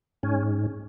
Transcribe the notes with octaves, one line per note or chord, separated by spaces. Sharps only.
G#2 C#4